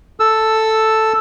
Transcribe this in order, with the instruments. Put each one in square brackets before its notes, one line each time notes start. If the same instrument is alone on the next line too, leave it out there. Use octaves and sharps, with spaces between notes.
[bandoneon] A4 E6